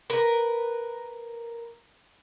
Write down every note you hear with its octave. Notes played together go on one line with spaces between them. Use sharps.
A#4 B4